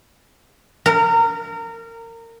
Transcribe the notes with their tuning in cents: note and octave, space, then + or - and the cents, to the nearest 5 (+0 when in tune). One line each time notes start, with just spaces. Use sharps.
A#4 -25